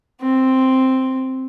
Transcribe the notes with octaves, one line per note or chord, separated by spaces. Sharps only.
C4